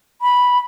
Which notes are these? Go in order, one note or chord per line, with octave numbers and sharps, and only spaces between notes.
B5